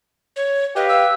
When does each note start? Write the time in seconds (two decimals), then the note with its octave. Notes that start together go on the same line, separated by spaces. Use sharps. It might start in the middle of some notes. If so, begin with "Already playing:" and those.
0.36 C#5
0.76 G4 B4 D#5 F5
0.89 E6